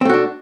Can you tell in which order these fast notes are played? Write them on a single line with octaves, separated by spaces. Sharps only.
C4 A3 F#4 D4